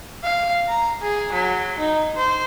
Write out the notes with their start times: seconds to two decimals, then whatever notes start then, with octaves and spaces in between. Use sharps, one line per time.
0.24 F5
0.68 A#5
1.02 G#4
1.33 F#3
1.79 D#4
2.16 C5